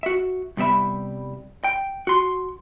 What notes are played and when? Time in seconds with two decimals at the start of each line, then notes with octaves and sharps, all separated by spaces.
0.03 F#4 E5
0.57 C2 G3 B3 E5 B5
1.64 G5
2.07 F#4 C6